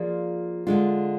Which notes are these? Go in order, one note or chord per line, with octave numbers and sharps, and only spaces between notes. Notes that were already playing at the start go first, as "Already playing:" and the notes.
Already playing: F3 A#3 F4 G#4 D5
D3 G#3 D4 F4